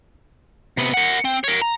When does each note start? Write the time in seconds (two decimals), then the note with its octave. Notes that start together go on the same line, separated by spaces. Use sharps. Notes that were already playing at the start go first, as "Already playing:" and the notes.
0.77 C3 B3
0.94 A#4 F#5
1.25 C4
1.44 A#4 C#5
1.62 A#5